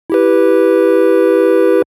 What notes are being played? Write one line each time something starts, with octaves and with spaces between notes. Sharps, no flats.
E4 G4 B4